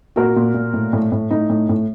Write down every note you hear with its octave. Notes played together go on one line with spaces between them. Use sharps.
A#2 F#4 A#4
A#2
A#2
A2
A2
A2
A2 D#4
A2
A2